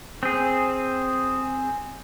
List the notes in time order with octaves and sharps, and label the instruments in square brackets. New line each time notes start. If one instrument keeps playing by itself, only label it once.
[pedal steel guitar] C4 G#4